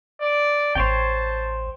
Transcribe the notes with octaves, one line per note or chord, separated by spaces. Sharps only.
D5
A1 C5 C#5 G5 A5